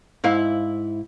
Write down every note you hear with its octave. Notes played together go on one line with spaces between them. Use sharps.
G#2 E4 F5